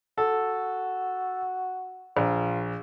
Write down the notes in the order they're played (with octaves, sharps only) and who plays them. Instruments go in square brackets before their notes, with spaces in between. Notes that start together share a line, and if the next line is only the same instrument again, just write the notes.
[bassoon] F#4 [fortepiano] A4
[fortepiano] A#1 [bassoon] F4